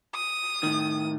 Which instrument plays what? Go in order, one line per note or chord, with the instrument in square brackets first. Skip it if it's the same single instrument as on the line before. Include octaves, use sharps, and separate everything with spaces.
[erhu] D#6
[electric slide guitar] A2 D#3